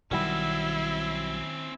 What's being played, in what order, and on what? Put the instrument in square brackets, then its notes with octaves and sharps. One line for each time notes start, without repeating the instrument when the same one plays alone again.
[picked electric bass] B1 F#3 G3 [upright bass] D#3 [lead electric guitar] C4 C#4 [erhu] E4